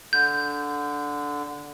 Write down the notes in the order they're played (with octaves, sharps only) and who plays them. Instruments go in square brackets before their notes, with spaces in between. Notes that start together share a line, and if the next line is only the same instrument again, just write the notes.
[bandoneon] D3 [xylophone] G6